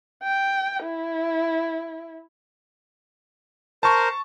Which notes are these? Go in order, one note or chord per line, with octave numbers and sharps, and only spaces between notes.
G5
E4
A#4 C5 A5 C#6